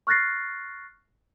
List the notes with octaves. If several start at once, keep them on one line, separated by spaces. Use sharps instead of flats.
C#6 F6 F#6 A6 A#6 C7